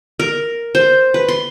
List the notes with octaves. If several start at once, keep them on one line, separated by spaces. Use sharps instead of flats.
A#4
C5
B4
C6